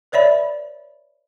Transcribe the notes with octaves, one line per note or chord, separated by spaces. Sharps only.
B4 C#5 D5 E5 B5